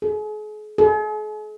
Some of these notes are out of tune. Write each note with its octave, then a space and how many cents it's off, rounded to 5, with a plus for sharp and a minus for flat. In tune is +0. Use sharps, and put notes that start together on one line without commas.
G#4 +40
G#4 +45